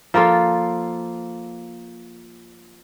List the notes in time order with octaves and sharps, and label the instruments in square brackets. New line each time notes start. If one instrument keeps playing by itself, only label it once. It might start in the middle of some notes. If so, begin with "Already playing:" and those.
[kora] F3 A#3 F4 A4